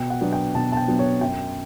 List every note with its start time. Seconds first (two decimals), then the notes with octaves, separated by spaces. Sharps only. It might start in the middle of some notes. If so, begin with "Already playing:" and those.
Already playing: B2 G5
0.10 F#5
0.21 F#3 B3 D4
0.33 G5
0.55 B2 A5
0.72 A5
0.77 G5
0.88 F#3 B3 D4
0.99 C#5
1.21 F#2 G5